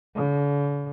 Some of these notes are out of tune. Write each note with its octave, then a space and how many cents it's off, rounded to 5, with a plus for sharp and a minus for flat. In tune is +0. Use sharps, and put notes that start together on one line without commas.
D3 -45